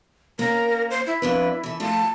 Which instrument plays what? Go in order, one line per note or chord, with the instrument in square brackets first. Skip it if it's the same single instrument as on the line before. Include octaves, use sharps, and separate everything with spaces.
[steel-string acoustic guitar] A#3 C#4 [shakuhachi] A#4
[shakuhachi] C5
E4
[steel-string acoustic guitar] F2 D4 B4
E3 A4
[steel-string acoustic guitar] F3 A3 F4 [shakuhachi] A5